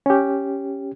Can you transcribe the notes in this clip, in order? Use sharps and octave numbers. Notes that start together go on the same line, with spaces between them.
C#4 G4